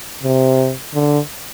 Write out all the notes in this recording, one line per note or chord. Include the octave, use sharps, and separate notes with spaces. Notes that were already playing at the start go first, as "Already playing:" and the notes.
C3
D3